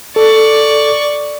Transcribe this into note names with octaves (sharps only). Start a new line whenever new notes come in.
A4 D5 C#6